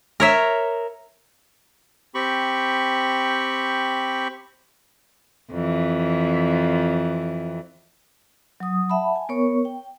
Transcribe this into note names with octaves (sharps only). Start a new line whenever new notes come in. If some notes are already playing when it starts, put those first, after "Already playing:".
A#4 C#5 E5
C4 G4 B5 C#6
F2 E3
F#3 D#6
E5 F#5 A5 B5
G#5
B3 A#4 C#5 C#6
G5